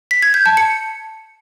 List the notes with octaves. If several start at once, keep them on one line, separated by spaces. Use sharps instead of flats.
B6
G#6
G6
A5
C#7